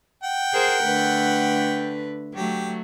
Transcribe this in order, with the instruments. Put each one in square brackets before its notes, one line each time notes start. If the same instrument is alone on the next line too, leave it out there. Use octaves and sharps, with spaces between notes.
[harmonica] F#5 G5
[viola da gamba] G#4 A#4 C5
D3 A3 B4
[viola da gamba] F#3 A3 [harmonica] G4